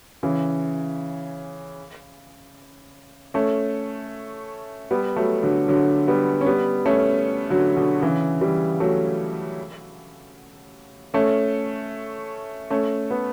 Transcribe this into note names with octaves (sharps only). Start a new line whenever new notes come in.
C#3 E3
A3 C#4
G3 B3
F#3 A3
D3 F#3
D3 F#3
G3 B3
C#4
G3 B3
A3 C#4
D3 F#3
B2 D3
C#3 E3
E3 G3
F#3 A3
A3 C#4
A3 C#4
B3